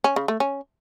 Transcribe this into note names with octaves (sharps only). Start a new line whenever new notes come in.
C#4
C#3
A3
C#4